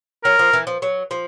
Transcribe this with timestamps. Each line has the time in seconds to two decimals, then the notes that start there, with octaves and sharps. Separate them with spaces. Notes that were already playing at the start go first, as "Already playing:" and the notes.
0.24 F#3 A#4
0.39 F3
0.53 E3
0.67 F3
0.82 F#3
1.11 F3